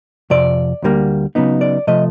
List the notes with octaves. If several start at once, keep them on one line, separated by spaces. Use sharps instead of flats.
F2 C3 D5
D2 D3 G3 A#3
C#3 F#3 B3 D#4
D5
C3 F3 A3 D#5